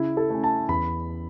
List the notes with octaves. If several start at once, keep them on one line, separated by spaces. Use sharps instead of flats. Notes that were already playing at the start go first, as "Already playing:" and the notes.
Already playing: C#3 E4
A4
A3 C#4
A5
E2 B5